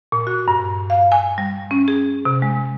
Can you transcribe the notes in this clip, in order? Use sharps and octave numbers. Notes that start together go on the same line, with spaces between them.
A#2
F#4
G2
F5
G#5
G3
C#4
G#4
C3
G#3